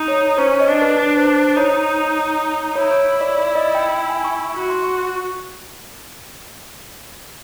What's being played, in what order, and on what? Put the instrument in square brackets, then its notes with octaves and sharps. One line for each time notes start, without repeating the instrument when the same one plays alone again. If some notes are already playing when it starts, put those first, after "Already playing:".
Already playing: [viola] D#4
[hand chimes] C#5
C#5
[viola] C#4 [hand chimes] C5
[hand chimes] C#5
D#5
[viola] D4 [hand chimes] D5
[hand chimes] B4
[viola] D4 [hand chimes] B4
[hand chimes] C5
C5
[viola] D#4 [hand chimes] C#5
[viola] E4 [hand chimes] C#5
[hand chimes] C#5
C#5
D5
D5
D#5
G5
G5
G#5
C#6
C#6
[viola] F#4 [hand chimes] C#6
[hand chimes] C6
C#6